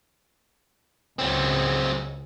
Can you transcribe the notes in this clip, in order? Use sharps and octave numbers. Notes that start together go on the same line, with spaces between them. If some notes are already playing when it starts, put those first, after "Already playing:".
C#2 C#3 F#3 C4